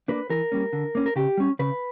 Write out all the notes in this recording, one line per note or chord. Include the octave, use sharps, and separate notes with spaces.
A#3 D4 B4
E3 A#4
G3 A#3 C#4
D3
A#3 C#4
A#4
C#3 G4
G3 C#4
C#3 B4